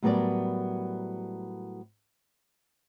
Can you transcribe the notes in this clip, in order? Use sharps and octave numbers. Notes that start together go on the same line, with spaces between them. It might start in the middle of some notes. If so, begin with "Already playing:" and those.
A2 F#3 G3 B3 A#4 D5